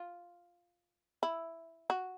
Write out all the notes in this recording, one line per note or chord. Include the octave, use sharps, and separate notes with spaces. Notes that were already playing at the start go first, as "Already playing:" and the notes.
Already playing: F4
E4
F#4